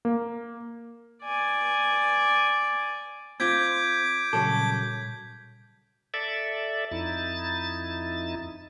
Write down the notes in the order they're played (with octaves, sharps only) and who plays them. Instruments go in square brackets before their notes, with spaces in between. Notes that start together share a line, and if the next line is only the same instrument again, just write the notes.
[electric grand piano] A#3
[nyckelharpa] D5 G#5
[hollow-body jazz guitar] C4 F4 [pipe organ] D6 [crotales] G6 G#6 B6
[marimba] A#2 G3 [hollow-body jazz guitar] C#3 F#3 A4
[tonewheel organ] A4 D5 E5
F2 D#4 E4 A6